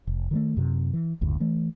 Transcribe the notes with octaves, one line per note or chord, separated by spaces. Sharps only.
F1
D#3 E3 A3
F#2 C3
E3
F#1 D2 G#2
E3 A3